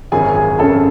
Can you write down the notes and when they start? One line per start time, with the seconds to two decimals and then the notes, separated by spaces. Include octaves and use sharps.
0.12 G#1 F#2 C#3 G#4 G#5
0.35 G#4 G#5
0.59 G#1 F#2 C#3 A4 A5